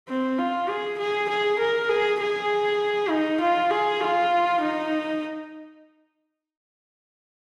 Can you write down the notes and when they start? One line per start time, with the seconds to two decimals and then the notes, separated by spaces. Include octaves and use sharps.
0.09 C4
0.39 F4
0.69 G#4
0.99 G#4
1.29 G#4
1.59 A#4
1.89 G#4
2.20 G#4
3.10 D#4
3.40 F4
3.71 G#4
4.01 F4
4.61 D#4